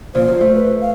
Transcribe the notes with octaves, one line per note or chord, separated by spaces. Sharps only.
A#2 C#3 F3 C5
F3 F#3
A3
B4
F5